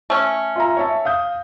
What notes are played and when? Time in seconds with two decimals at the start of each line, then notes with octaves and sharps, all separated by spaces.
0.10 A3 C#4
0.56 F4 E5 A#5
0.77 C#5 E5 A5
1.05 F5 D#6 G6